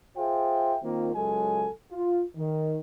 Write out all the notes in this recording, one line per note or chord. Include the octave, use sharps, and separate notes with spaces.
F4 G#4 C5 E5 G5
D#3 A#3 C4 F4
C#2 F#3 G#3 A4 G#5
F4
D#3